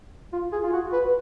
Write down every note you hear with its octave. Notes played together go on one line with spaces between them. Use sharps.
F4
G#4
F4
F#4
B4